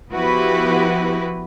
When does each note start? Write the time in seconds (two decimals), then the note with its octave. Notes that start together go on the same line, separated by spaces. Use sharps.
0.13 F3 B3 E4 F#4 G4 B4